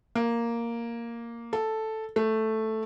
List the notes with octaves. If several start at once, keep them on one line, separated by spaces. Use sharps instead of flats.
A#3
A4
A3